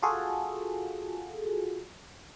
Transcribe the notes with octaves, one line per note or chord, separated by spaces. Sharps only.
F4 F#4 G#4 A4